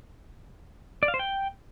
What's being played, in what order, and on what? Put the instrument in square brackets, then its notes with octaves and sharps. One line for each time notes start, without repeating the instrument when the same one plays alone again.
[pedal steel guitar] D5
F5
C5
G5